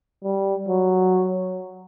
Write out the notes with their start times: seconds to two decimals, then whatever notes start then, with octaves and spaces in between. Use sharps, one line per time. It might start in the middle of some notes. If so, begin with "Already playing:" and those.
0.24 G3
0.68 F#3